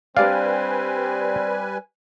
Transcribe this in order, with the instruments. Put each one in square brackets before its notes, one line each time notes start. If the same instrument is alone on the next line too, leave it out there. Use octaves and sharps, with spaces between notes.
[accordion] G3 B4 G#5 [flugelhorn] C4 [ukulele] D4 G4 D5 [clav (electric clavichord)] F5